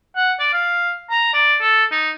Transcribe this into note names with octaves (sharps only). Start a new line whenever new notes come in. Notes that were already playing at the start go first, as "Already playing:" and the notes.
F#5
D5
F5
A#5
D5
A4
D#4